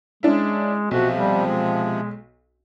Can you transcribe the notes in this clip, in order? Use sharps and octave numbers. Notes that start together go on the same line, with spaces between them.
G#3 C#4 D4 E4
B1 C3 F3 F#4
G3
G#3